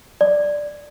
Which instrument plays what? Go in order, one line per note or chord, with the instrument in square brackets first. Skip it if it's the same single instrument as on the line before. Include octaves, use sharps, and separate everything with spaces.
[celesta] D5